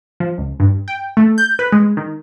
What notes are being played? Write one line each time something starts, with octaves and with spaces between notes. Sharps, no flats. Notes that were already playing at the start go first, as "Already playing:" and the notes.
F3
C#2
G2
G5
A3
G6
B4
G#3
D#3